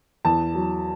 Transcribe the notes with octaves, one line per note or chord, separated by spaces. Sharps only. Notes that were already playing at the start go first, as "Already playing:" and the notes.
E2 A5
F#3